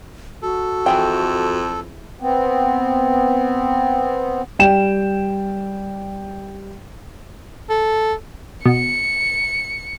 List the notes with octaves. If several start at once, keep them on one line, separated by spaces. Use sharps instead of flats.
F#4 A4
F2 E3 G#4 G5
B3 C4
G3 G5 E7
A4
B2 C#7